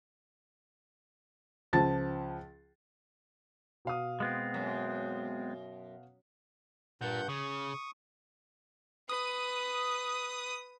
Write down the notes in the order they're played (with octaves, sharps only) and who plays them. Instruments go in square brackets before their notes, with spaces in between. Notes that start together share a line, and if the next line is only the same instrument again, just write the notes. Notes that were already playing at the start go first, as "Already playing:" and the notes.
[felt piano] C#2 F3 A5 A6
[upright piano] B2 F5 D#6
[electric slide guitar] G#3 B3 C4
[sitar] F#2
[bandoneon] G2 F#5 G6 [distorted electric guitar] A#2
[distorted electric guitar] C#3 [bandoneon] C#6 D#6
[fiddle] B4 [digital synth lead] D#6